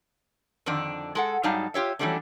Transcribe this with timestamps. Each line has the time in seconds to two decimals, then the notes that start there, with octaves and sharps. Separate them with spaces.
0.66 F2 D3 D#3 D4
1.15 G#3 A4 F#5
1.43 G#2 F#3 G3 D#4 F5 A5
1.74 F4 G4 C#5 E5
1.99 E3 F#3 G3 A3 C#4 D4